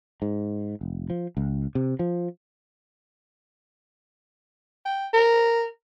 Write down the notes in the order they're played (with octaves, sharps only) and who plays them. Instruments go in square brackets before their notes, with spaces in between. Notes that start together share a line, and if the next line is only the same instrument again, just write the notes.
[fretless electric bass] G#2
F1
F3
C#2
C3
F3
[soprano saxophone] G5
A#4